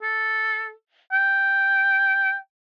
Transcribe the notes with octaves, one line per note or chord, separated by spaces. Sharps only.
A4
G5